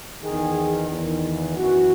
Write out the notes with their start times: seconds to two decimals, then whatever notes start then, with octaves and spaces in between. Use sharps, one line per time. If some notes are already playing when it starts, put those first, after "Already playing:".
0.24 E2 D#3 G#4
0.90 E2 D#3
1.56 F#2 E3 F#4